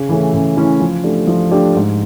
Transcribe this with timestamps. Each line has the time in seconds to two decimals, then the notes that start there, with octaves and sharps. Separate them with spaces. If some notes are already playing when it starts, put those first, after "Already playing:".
Already playing: C#3
0.09 E3 A3 C#4 E4
0.34 C#3
0.57 E3 A3 C#4 E4
0.80 F3
1.04 A3 D4 G4
1.27 F3
1.51 A3 D4 G4
1.75 G#2